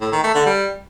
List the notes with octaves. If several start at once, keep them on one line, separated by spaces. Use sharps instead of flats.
A2
D#3
A3
D3
G3